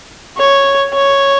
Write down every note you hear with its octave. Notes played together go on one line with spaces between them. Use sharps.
C#5
C#5